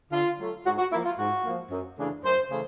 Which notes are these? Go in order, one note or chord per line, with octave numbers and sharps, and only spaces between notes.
D3 F4
F#3 A3
G#2 F#4
F#4
F3 A#3 E4
F4
G#2 F#4
F3 A#3
F#2
C#3 E3 A3 D4
F#2 C5
C#3 E3 A3